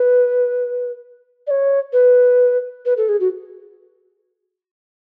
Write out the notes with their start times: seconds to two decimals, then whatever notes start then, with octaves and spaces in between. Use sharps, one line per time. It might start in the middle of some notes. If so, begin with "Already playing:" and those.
Already playing: B4
1.47 D5
1.51 C#5
1.93 B4
2.86 B4
2.97 A4
3.09 G#4
3.20 F#4